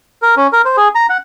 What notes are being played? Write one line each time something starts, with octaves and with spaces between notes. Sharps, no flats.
A#4
C#4
A#4
C5
G#4
A#5
F#5